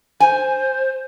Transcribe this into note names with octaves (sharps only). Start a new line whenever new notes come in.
C5 G#5